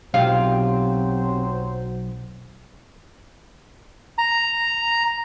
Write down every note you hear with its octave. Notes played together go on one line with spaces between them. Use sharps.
B1 C3 F#3 F4 C5 F5
A#5